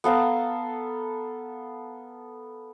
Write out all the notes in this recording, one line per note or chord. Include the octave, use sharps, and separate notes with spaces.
B3 A4 F5 A#5